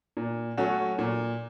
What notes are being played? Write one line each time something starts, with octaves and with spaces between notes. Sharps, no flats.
A#2
F#3 A3 C#4 F#4
A#2